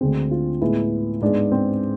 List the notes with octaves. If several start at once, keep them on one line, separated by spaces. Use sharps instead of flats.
D2 D3 G#3 C4
F4
A2 G#3 B3 E4
G#2 G#3 B3 D4
C4